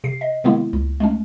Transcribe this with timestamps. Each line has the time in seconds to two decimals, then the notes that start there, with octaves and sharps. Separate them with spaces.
0.04 C3 C7
0.21 D#5
0.44 C3 D#3 G#3 A#3 B3 E4
0.73 C#2
1.00 G#3 A3 C#4